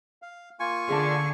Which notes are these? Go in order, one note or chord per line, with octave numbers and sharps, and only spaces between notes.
F5
A#3 F4 G#5 C#6
D3 G#4 D5 A5